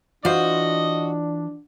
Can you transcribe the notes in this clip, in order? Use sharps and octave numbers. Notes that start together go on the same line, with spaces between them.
E3 D4 F4 F#4 C5 D#5